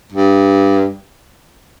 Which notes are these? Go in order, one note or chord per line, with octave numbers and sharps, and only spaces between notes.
G2